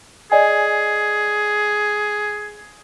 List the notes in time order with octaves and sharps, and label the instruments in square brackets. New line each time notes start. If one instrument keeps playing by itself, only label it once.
[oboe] G#4 [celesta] D5 D#5 G#5